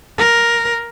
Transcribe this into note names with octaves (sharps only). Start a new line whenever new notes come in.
A#4